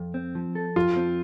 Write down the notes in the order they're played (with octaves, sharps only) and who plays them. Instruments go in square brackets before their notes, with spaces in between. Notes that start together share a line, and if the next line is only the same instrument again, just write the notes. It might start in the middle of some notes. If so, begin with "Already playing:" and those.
Already playing: [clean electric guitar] F2
C4
F3
A4
[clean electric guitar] F2 [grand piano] F4
[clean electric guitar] C4